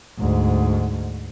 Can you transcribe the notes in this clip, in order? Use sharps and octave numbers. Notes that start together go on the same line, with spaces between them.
D2 G#2